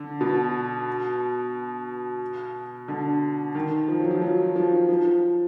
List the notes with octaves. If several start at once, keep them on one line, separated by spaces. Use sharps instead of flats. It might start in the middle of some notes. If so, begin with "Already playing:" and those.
Already playing: D3
B2
D3
D#3
F3
F#3
F3
F#3
F3
F3